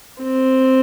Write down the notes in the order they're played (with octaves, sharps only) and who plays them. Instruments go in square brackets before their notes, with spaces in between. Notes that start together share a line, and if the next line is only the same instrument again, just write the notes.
[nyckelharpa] C4